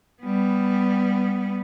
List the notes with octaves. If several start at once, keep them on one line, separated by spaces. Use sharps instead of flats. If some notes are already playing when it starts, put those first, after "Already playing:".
G3 B3